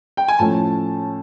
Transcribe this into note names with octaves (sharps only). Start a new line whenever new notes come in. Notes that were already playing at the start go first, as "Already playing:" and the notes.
G5
G#5
A2 F3 A3 C#4 A5